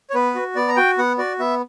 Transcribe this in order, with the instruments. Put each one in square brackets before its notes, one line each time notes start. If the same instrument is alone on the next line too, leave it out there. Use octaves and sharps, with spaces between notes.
[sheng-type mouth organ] C#5
B3 B4
F#4
B3 D5
A#5
F#4 G5
B3 F#5
F#4 D5
B3 E5